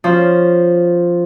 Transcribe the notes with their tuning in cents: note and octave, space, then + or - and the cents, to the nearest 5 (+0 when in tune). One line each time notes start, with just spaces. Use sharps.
F3 +0 C#4 +0